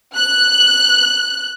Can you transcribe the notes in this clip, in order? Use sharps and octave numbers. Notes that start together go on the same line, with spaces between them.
F#6